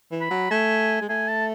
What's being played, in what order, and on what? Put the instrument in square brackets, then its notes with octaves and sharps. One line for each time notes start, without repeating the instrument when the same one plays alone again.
[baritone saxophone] E3
[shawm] B5
[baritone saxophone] F#3
[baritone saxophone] A3 [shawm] G#5
[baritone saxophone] G#3
[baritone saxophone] A3 [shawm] G#5
[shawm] A5